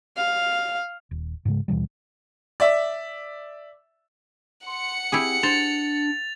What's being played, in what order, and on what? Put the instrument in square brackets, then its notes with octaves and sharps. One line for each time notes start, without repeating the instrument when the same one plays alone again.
[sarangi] F5
[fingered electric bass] D#1
G#2 C#3 G#3
D#2 B2 E3 G3
[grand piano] D5 E5
[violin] F#5 C#7 [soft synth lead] C6
[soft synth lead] C4 [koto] E4 G4 G#4
[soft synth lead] D4 [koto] C5 [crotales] A6 F7